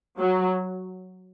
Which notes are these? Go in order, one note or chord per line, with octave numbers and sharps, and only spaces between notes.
F#3